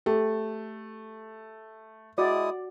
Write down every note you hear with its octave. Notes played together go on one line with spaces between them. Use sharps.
A3 G4
G#3 E4 F#4 D5 D#6